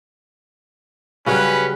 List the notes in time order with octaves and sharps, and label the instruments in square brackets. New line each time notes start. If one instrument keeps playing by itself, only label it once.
[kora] C#3 F#3 G3 [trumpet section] C#4 B4